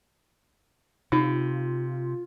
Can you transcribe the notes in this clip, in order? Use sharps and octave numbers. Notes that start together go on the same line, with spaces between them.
C3 D#4 F4